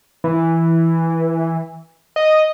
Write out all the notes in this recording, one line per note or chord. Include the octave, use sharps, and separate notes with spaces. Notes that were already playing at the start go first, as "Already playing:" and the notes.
E3
D#5